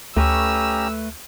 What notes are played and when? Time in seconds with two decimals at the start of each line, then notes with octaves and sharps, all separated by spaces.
0.17 D2 A3 C#4 G4 B4 A#5 C#6 E6